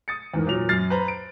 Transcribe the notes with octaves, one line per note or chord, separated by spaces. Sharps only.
D#6 A6 C#7
E2 G#2 A#4
A#2 F#3 F7
F#2 F6 A6 C7
B4 C5 A#5
D7